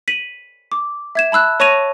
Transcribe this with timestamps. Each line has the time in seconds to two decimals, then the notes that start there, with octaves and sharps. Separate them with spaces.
0.08 B6 D#7 F#7
0.72 D6
1.15 E5 G#6 E7
1.32 A5 B5 E6 F#6
1.60 C#5 A5 C#6 A#6 D#7 F7